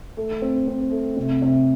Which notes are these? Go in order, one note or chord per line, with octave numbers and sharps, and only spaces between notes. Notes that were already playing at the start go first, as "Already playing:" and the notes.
A3
C4
C4
A3
C3
C3